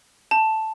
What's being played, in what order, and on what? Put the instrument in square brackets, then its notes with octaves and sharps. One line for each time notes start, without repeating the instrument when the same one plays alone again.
[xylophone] A5